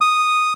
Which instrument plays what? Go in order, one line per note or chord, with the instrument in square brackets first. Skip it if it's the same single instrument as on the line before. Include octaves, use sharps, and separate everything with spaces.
[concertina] D#6